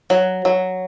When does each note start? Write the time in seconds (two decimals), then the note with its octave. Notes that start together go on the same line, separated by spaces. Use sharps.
0.10 F#3
0.45 F#3